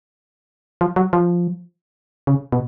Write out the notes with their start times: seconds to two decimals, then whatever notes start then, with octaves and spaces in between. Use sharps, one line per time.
0.81 F3
0.96 F#3
1.13 F3
2.27 C#3
2.52 B2